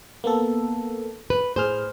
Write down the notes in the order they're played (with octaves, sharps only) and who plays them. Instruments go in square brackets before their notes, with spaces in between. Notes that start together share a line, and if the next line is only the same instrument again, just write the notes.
[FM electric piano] A#3 B3 A4
[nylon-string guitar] B4
[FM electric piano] A2 G#4 F6 [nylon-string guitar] C5